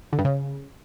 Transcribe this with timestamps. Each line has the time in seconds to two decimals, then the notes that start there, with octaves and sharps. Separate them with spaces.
0.13 D3
0.19 G2
0.25 C#3